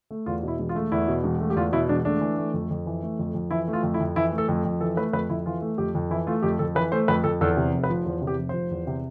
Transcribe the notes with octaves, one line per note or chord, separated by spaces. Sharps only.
A3
E2 F4
B2 E4
E1
F4
A3
E2 E4
B2
E1
A3
G4
E2 F4
B2 E4
E1 D4
A3 D4
E3
A3
F2
F2
E3
A3
F2
F2
E3 E4
A3
F4
F2
E4
F2
E3 E4
A3
A4
F2
F2
E3 A4
A3 B4
F2 B4
F2 E4
E3 F4
A3
F2 G4
F2
E3 E4
A3 F4
F2 G4
F2 A4
E3 B4
A3 C5
F2 B4
F2 A4
E2 A4
C3
F1
B4
F3
E2 C5
C3
G4
F1
F3 C5
E2
C3